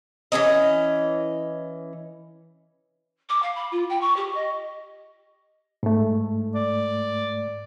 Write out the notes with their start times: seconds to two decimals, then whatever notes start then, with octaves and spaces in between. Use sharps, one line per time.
0.32 E3 G#3 C#4 D#5
3.29 D6
3.42 F5
3.55 B5
3.71 F4
3.89 G5
4.01 C#6
4.16 G4
4.34 D#5
5.83 G#2 A3
6.55 D5